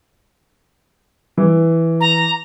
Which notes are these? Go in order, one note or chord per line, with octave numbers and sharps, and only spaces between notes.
E3
A#5